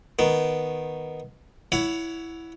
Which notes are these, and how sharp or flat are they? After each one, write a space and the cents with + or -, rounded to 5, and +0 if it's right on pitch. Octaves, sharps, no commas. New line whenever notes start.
D#3 +0 B3 +0
E4 +0 C#5 +20 F#5 -10